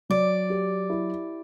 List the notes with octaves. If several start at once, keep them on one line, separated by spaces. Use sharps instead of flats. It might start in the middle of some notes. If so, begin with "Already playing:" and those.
F#3 D5
G4
E4